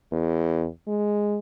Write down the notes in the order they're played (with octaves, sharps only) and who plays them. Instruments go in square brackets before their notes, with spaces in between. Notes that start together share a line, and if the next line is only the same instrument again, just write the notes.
[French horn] E2
G#3